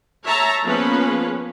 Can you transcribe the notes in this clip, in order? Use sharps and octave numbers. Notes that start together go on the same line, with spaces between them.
C#5 E5 A5 A#5
F3 A#3 B3 C#4 G#4 B4